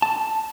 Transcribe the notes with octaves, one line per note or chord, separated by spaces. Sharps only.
A5